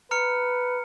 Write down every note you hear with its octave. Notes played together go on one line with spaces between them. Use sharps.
B4 A#5 F6 C#7